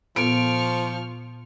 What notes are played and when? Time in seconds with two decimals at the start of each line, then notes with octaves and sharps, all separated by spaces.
0.16 A#2 F3 B3 A4 C#6 F6 D7